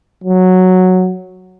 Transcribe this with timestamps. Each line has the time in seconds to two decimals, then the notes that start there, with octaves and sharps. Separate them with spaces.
0.24 F#3